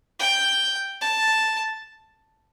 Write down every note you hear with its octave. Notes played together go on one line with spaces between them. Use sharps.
G5
A5